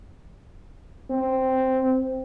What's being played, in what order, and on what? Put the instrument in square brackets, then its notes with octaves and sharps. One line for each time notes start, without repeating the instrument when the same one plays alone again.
[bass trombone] C4